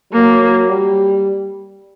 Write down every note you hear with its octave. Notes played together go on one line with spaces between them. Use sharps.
F#3 A#3
G3